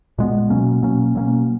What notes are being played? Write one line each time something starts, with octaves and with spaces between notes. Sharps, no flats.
A#2 G#3 B3
B2 F#3 A#3 C#4
B2 F#3 A#3 C#4
B2 F#3 A#3 C#4